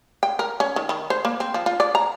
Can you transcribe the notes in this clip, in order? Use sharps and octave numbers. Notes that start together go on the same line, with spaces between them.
G5
A#4
C#4
D#3
D#3
C5
A#3
C4
F3
F4
D5
A#5